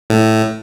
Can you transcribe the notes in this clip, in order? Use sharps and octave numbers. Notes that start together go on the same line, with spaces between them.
A2